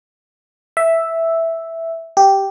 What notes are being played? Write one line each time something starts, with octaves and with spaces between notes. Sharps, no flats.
E5
G4